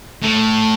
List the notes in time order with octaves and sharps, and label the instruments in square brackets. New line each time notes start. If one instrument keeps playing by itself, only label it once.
[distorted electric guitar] A2